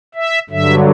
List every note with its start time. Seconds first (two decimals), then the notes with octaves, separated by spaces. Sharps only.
0.15 E5
0.49 G2 D3 F#3 E5